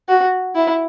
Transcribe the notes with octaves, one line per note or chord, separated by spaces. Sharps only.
F#4
E4